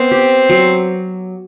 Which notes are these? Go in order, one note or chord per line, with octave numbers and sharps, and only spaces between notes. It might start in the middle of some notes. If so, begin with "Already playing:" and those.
Already playing: B3 C4
G4
F#3